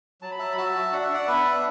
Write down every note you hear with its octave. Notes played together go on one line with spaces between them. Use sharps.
F#3 A5
B5
F#3 E5 A5
B5
F#4 E5 A5
F#4
D4 F#5
E5
D4 D5 F#5
B3 B4 E5
D4